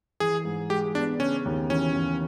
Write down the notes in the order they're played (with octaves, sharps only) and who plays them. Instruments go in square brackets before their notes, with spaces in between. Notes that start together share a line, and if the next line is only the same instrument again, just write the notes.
[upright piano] E3 [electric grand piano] G#4
[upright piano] G#2
[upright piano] G#3 [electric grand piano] G4
[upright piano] B3 [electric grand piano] D4
[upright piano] C#3 [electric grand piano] C#4
[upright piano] D#2
[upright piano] E3 [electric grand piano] C#4
[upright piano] D#2